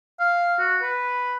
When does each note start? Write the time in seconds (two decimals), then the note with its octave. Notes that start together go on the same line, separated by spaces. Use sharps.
0.20 F5
0.59 F#4
0.82 B4